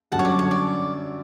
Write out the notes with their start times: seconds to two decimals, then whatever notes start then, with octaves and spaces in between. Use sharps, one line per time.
0.12 F#2 D3 G3 C#4 F#4 F#5 A5
0.19 C#5
0.25 D5
0.39 C#5
0.51 D5